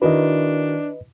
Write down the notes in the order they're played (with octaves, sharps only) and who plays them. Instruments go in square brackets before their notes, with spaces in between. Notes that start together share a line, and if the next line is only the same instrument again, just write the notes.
[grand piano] D#3 E4 F#4 [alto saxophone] D4 [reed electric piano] B4 D#5